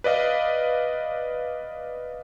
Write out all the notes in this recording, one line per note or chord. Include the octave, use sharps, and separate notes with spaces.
B4 D5 D#5 F5